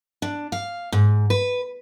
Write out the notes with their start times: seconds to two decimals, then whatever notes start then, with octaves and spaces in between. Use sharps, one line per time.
0.22 D4
0.52 F5
0.92 G#2
1.30 B4